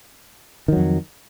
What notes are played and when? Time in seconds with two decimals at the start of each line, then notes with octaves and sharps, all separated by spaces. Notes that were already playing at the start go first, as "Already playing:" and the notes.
0.68 D#3
0.72 F#3
0.77 F2